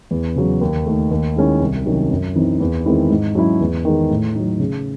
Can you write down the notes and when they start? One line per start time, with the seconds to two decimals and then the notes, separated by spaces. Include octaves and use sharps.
0.11 E2
0.36 C#3 F#3
0.61 D#2
0.86 D#3 A3
1.11 D#2
1.36 D#3 G#3 C#4 E4
1.61 C2
1.86 C3 D#3 F#3 C#4
2.11 F#2
2.35 E3 C4 D#4
2.61 E2
2.85 D#3 G#3 C4 E4
3.10 G#2
3.35 F#3 C#4 E4
3.61 E2
3.85 D#3 G#3
4.10 A2
4.35 F#3 A3 D#4
4.60 C#3